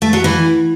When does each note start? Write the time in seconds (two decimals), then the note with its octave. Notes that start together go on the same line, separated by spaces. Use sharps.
0.02 A3
0.13 F#3
0.24 E3